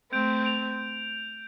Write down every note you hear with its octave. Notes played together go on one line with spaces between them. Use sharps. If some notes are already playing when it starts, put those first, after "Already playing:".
A3 C4 G6 D7 F7
G6 D7 F7